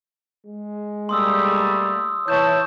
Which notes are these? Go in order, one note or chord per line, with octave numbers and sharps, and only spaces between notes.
G#3
G3 A3 A#3 C6 D#6 E6
E3 C#5 E5 A5 G6 E7